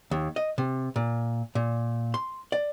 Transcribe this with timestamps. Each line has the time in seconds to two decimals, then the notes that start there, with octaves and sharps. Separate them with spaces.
0.11 D#2
0.36 D#5
0.58 C3
0.96 A#2
1.55 A#2
2.14 C6
2.52 D5